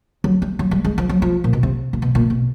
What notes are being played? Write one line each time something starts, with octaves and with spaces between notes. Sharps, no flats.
F#3
G3
F#3
G3
G#3
F3
F#3
F3
A#2
B2
C3
A#2
B2
A#2
B2